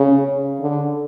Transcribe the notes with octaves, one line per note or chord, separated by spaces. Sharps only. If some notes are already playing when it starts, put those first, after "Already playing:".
Already playing: C#3
D3